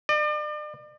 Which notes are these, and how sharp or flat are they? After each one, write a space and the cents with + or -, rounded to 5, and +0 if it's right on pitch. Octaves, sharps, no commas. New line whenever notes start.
D5 +40